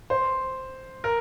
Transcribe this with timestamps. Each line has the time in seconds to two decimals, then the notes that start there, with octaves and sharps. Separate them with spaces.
0.10 C5
1.04 A#4